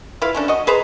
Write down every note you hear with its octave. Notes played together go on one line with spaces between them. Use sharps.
E4 F4 B4 F5
A3 C#4 D4
F#4 D#5
G#4 B4 C5 A#5